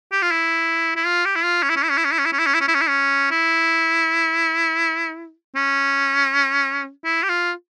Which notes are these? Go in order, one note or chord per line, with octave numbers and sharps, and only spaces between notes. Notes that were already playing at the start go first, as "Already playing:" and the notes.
G4
F4
E4
E4
F4
G4
E4
F4
C#4
E4
C#4
E4
C#4
E4
C#4
E4
C#4
E4
C#4
E4
C#4
E4
C#4
E4
C#4
E4
C#4
E4
C#4
E4
G4
F4